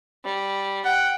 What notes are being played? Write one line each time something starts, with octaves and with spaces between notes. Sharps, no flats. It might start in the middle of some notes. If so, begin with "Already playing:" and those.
G3
F#5 G5